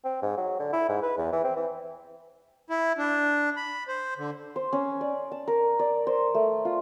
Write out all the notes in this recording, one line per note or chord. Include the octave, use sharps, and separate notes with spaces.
C4
G#2
F#3
D3
E4
G#2
B4
E2
E3
C4
E3
E4
D4
B5
C5
D3
C5
C#4
D5
A5
A#4
D5
C5
A3
F4